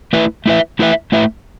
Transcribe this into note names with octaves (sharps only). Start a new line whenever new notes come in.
A3 E4 B4 E5
A3 E4 B4 E5
A3 E4 B4 E5
A3 E4 B4 E5